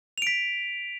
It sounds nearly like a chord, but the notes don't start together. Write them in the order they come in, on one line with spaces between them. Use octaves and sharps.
F7 D7 B6